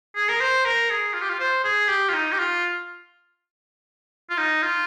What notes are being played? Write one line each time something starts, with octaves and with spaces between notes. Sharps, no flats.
G#4
A#4
C5
A#4
G#4
F4
G4
F4
C5
G#4
G4
F4
D#4
G4
F4
F4
D#4
F4